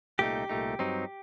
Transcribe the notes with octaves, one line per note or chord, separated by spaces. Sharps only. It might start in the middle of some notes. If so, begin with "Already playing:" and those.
C2 A#2 A3 D#4 G4
C2 A#2 A3 D#4
G2 F#3 C4 D#4